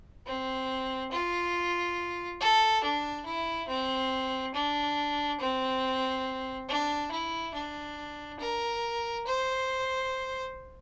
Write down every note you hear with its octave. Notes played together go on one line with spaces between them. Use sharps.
C4
F4
A4
D4
E4
C4
D4
C4
D4
E4
D4
A#4
C5